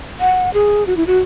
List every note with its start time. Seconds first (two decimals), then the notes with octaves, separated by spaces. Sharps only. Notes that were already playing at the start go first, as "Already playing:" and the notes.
0.20 F#5
0.54 G#4
0.87 F#4
0.97 E4
1.07 F#4